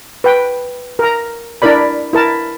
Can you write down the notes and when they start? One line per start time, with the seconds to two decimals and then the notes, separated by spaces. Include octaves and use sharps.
0.24 B4 G5
0.99 A#4 A#5
1.62 D4 E4 A#4 D5 B5
2.13 E4 A#4 A5